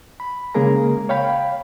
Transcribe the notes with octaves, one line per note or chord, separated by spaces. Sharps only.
B5
C#3 G#3 A#3 G#4 A#4 A#5
C#5 F5 G5 B5